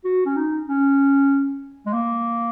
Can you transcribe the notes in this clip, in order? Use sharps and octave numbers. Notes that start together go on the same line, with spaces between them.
F#4
C#4
D#4
C#4
G#3
A#3